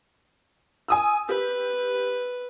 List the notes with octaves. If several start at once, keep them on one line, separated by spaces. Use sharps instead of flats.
G#5 D#6 E6
G4 B4